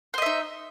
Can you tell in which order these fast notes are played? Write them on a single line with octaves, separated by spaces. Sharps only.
C5 D#5 E5 D#4